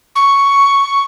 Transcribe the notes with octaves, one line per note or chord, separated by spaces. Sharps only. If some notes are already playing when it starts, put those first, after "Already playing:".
C#6